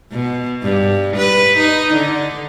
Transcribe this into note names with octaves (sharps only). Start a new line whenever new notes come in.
B2
G2
B4
D#4
D3